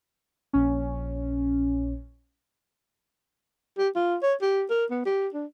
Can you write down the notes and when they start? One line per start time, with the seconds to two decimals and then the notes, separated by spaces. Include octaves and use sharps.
0.53 A#1 C#4
3.78 G4
3.95 F4
4.22 C#5
4.41 G4
4.70 A#4
4.91 B3
5.06 G4
5.34 D4